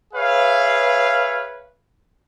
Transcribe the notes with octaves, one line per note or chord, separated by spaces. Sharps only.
G#4 B4 C#5 E5 F5